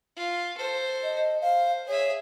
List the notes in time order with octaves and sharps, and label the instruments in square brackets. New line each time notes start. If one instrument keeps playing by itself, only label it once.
[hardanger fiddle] F4
A4 C5
[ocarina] D#5
[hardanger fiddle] C5 [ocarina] F5
[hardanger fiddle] G#4 E5 [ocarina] C#5